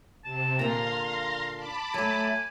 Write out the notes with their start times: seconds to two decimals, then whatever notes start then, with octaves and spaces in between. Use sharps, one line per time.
0.25 C3 A5
0.59 A#2 D3 F5 A#5 C6
1.56 A5 B5 D6
1.94 F#3 A3 G#5